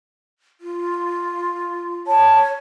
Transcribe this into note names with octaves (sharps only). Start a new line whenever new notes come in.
F4
C#5 A5